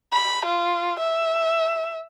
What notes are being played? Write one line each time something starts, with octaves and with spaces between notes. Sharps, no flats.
B5
F4
E5